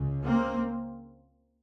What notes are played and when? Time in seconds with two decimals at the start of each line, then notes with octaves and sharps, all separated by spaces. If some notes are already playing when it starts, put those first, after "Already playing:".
Already playing: C#2 C#3
0.25 A#3 C4